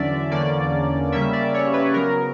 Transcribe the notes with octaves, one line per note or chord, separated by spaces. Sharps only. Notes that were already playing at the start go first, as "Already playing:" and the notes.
Already playing: E2 D3 F#3 C#4 D5 E5
E2 D3 A#3 C#4 D5
C#3 G3 A#3 C#4 E5
D5
C#5
B4
C#3 F#3 B3 A#4